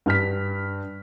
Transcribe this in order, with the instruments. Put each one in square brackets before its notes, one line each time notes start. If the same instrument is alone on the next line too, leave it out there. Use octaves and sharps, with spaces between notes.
[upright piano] G2 F6 B6